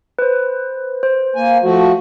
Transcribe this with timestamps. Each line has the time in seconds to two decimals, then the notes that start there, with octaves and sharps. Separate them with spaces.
0.19 B4 C5
1.03 C5
1.36 A#3 G#5
1.63 F3 A3 F#4